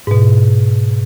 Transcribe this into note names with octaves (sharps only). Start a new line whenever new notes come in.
G#2 B2